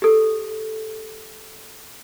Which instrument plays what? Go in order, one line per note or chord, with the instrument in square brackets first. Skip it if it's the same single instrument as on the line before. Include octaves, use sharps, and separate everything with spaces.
[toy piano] G4 A4